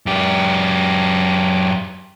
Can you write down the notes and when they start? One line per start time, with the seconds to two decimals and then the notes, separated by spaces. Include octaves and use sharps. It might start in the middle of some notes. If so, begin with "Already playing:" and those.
0.06 F#2 G4